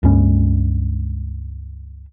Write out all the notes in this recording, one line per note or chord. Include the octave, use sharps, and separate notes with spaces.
C#2 G2 G#3 C#4